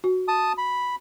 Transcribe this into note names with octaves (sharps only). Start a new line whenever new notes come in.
F#4
A5 D#6
B5